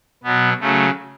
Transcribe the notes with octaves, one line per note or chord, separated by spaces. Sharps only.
B2 F#3 B3
C#3 F#3 A3